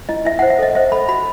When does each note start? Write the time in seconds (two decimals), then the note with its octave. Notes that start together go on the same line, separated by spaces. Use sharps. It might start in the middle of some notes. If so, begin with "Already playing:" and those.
0.09 E4 D#5
0.25 E4 E5
0.39 C5 F#5
0.50 E5
0.59 A4 D#5
0.75 C5 E5
0.92 A4 B5
1.09 F#4 B5